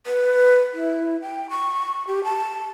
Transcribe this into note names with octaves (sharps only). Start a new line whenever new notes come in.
B4
E4
G5
C#6
G4
A5